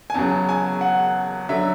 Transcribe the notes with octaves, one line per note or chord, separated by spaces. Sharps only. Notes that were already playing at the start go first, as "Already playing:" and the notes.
G#5
E2 C#3 F#3 A5
G#5
F#5
D3 F#3 E5